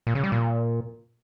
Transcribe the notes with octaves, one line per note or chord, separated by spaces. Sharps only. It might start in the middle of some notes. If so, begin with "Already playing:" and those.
A#2
C#3
G3
A#2